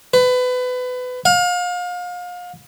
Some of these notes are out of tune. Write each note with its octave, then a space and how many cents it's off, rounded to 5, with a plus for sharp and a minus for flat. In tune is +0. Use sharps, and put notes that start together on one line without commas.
B4 +25
F5 +35